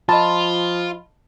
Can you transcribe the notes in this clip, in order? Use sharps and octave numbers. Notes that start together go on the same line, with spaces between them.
F3 F4 D#5 A5 B5